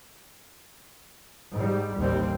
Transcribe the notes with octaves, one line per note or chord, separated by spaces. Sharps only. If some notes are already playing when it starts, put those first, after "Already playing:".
G#2 G3
A1 D#2 G3 C4